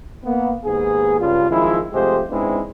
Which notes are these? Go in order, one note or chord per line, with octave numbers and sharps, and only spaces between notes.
A#3 B3
D#2 G#2 B3 G#4
C#2 G2 F4
F#2 D#3 F3 G#3 E4
C3 F3 G#3 A3 G4 C5
G#2 G#3 B3 C4 D4 E4